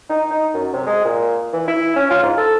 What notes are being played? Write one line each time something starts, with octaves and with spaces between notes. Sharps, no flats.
D#4
D#4
F#2
C3
G#3
A#2
E3
E4
C#4
F4
G#2
A4